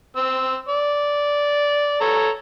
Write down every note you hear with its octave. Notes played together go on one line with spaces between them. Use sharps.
C4 E6
D5
A4 C#5 A#5